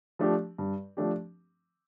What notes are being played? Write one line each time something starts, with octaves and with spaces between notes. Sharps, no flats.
F3 A3 D4 G4
G2
F3 A3 D4 G4